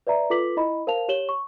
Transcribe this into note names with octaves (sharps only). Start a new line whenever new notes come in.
B4 D5 E5 A#5
F4 A4 B4 D6 B6 F#7
E4 D#5 B5
A#4 C5 F5 A5 F7
G4 C#5 E7 F#7 G7
C#6